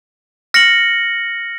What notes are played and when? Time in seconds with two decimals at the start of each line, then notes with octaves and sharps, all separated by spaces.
0.54 F6 A#6 C#7 F#7